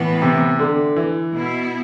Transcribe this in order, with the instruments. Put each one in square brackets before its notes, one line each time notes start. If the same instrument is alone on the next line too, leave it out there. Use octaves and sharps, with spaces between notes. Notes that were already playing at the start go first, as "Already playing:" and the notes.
Already playing: [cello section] A2 E3 B3
[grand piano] C3
D3
E3
[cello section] B2 B3 E4